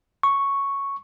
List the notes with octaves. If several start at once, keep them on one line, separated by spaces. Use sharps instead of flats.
C#6